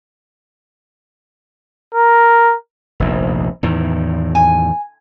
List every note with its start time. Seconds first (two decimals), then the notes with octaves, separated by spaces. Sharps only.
1.94 A#4
3.00 F1 A#1 D#2
3.63 E2 A2 D#3
4.35 G#5